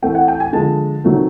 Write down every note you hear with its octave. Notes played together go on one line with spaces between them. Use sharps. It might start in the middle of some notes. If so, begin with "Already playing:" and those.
E3 A3 C4 G5
F#5
G5
G#5
D3 F3 G#3 A5
D#3 F#3 A3 C4